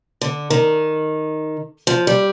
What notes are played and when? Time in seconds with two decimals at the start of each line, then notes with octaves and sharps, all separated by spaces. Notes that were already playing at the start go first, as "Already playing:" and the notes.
0.21 D3
0.50 D#3
1.87 F3
2.07 G3